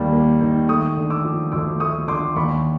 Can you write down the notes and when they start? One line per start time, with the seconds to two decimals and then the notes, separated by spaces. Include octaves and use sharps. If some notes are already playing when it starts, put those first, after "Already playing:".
Already playing: D#2 D#3 G3 A#3
0.13 A#3
0.41 D#3
0.68 A3 C#6 D#6
0.97 D3
1.10 D6 E6
1.25 F3
1.52 D2 D6 E6
1.80 A3 C#6 D#6
2.08 D3 C6 D6
2.36 D#2 B5 C#6